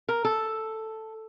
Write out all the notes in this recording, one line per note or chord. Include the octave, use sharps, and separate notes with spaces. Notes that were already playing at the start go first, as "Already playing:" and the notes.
A#4
A4